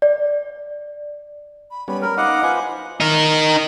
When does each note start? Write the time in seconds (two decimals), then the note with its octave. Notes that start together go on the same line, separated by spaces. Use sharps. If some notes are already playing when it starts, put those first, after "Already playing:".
0.02 D5
1.71 B5
1.88 G3 B3 C#4 B5
2.02 A#4 B5
2.18 D#4 D#5 F5 F#5 D6
2.43 F4 B4 C5 G#5
3.00 D#4 A#4